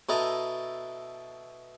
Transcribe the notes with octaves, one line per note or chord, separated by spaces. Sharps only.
B2 E4 A4 D#5 A#5